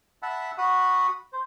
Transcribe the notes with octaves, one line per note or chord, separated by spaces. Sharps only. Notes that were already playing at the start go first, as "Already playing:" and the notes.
E5 F#5 A5 B5
F#4 F#5 B5 D#6
C5